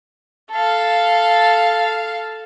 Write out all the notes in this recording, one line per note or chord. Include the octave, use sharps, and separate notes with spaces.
A4 F5